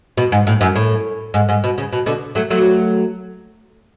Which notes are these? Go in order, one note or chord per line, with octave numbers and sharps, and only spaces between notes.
B2
G#2
A2
F#2
A2
G#2
G#2
B2
C#3
B2
B2 D3
F#3 A3
F#3 A3